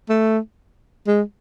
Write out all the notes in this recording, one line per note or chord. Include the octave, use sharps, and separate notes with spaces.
A3
G#3